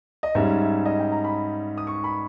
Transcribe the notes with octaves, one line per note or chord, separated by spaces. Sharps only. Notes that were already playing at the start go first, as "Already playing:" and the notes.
D#5
G#2 G3 C#4 E5
E5
D#5
G5
A#5
B5
D#6
C#6
B5